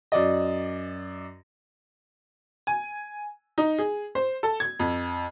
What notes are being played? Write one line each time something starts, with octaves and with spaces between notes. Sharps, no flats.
F#2 D5 D#5
G#5
D#4
G#4
C5
A4
G#6
F2